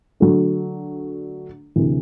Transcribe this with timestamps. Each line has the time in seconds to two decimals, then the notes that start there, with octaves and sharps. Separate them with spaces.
0.20 D3 F#3 A3 D4
1.76 D2 C3 E3